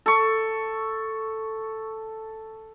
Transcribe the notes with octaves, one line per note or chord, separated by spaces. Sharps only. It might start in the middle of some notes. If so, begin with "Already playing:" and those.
A4 C#6